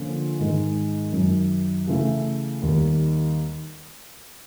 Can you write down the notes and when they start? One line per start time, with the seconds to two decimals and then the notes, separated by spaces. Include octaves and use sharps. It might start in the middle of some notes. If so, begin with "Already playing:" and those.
Already playing: D3 F3 A#3 C#4 F4
0.39 G#2 D#3 G#3
1.13 F#2 D#3 F#3
1.87 C#3 E3 A3
2.62 D#2 D#3 G3